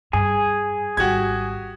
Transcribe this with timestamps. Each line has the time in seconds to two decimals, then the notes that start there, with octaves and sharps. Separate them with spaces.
0.13 G2 G#4 G#5
0.97 G#1 G3 F#4 G4 G#6